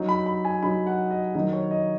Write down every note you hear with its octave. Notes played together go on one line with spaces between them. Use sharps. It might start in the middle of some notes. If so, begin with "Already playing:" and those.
Already playing: F#3 D#4
B5
B5
G#5
F#3 D#4 B5
F#5
D#5
D#3 F#3 D#4 D#5
C#5
D#5